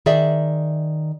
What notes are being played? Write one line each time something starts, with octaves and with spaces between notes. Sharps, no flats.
D#3 G#4 D5 E5